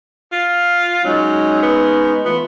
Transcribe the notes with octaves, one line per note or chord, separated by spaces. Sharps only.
F4
F#3 G#3 C#4 D#4
B3
E3 A3 B3 F4